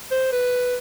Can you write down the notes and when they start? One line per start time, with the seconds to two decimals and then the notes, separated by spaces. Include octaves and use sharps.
0.11 C5
0.32 B4